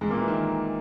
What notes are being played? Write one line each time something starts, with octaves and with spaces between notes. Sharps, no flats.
G#2 G#3
A#2 A#3
E3
D#3